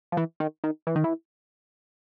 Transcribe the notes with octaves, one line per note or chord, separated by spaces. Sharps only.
F3
E3
D#3
D#3
E3
D#3
E3